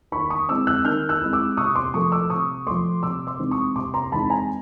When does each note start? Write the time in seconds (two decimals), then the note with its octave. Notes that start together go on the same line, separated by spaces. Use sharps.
0.12 D#3 B5 C#6
0.30 C#6 D#6
0.49 G#3 C4 E4 D6 E6
0.67 E6 F#6
0.85 D#3 F6 G6
1.09 E6 F#6
1.21 G#3 C4 E4
1.33 D6 E6
1.57 C3 C#6 D#6
1.75 C6 D6
1.94 F3 A3 C#6 D#6
2.12 D6 E6
2.30 C3 C#6 D#6
2.66 F3 A3 C6 D6
3.03 C3 D6 E6
3.27 C6 D6
3.39 E3 G#3 C4 D#4
3.51 C#6 D#6
3.76 C3 C6 D6
3.94 A#5 C6
4.12 E3 G#3 C4 D#4 A5 B5
4.30 G#5 A#5